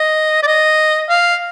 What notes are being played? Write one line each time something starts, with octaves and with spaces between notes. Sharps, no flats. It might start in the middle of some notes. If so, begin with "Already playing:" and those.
Already playing: D#5
D5
D#5
F5